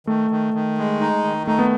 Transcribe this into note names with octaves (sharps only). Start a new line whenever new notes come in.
D#3 A3
D#3
D#3
G#3
D#4
D#3
A3 D#4
B3